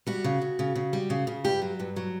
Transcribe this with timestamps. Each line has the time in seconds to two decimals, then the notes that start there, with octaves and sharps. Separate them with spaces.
0.07 G3 F#4
0.24 C#3
0.41 C#3
0.59 C#3
0.76 C#3
0.93 G3
1.10 C#3
1.27 C#3
1.44 G2 G4
1.62 F#3
1.80 G2
1.96 F#3